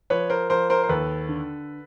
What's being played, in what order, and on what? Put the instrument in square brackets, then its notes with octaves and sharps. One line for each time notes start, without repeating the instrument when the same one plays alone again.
[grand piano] F3 B4 C#5
A#4 C5
F3 A#4 C5
A#4 C5
C5
D#2 A4 B4
D3